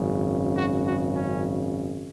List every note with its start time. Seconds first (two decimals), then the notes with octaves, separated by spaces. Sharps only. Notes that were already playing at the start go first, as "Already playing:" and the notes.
Already playing: G#1 F#2 C#3
0.57 F#4
0.86 F#4
1.15 C#4